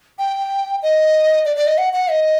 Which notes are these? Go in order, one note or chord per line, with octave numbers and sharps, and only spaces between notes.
G5
D#5
D5
D5
D#5
F#5
F#5
D#5